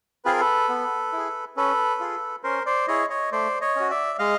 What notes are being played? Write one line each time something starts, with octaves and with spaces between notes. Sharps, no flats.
C4 F4 G#4 B4
A#4
A4 B4
B3
E4 G#4
C#4 A4 B4
F4 G#4
C#4 A#4 C5
C5 D5
E4 G#4 C#5 D#5
C#5 D#5
A3 C5 D5
C#5 D#5
C#4 F#4
D5 E5
G#3 D#5 F5